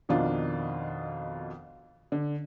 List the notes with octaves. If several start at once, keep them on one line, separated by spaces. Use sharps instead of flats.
F2 B2 D#3 D4 F4
D3